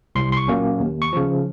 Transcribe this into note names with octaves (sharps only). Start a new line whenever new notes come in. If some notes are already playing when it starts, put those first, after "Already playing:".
C2 C6
C6
C#6
A#2 F#3 A#3 C#4
D#2
C#6
C#3 F3